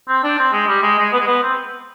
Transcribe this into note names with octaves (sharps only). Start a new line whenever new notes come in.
C4
D4
C4
G#3
G3
G#3
G#3
B3
G#3
B3
C4